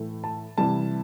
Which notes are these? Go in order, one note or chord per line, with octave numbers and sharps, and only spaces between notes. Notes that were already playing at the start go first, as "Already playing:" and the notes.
Already playing: A2 E3 A3
A5
C3 E3 G3 A5